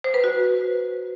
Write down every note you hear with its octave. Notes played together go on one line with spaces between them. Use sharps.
C5
B4
F#4